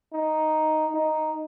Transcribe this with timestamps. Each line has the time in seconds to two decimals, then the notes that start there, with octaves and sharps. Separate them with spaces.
0.13 D#4
0.94 D#4